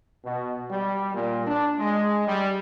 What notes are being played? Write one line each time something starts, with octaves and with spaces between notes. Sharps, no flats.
B2
G3
A#2
D4
G#3
G3